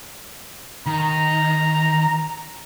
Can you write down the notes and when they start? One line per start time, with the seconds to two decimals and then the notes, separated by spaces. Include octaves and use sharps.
0.86 D#3 A#5